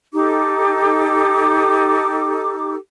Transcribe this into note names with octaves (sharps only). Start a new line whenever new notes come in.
D#4 G4 A4 D6